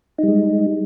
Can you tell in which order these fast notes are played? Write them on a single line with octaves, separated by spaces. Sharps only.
D#4 G3 G#3